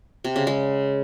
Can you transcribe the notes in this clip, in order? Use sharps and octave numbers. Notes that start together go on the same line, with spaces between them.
C3
C#3
G#3